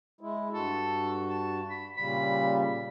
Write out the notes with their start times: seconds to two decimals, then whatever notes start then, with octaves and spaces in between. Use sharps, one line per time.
0.21 G#3 E4
0.53 G2 F#4 A4
1.29 A5
1.70 B5
1.97 A#2 C#3 G3 B5